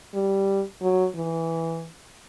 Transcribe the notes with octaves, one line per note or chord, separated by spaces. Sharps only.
G3
F#3
E3